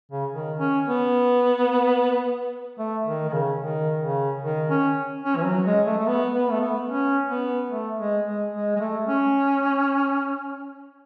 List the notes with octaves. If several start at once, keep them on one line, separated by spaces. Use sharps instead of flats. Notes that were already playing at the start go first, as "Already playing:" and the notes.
C#3
D#3
C#4
B3
A3
D#3
D#3
C#3
D#3
C#3
D#3
C#4
C#4
E3
F#3
G#3
A3
A3
B3
B3
A3
B3
C#4
B3
A3
G#3
G#3
G#3
G#3
A3
C#4